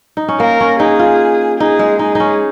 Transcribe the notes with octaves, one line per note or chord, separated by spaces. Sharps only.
D#4
C#4
A#3 A#4
C#4
D#4 G#4
F4
D#4 G#4
G#3
D#4 G#4
C#4 D#4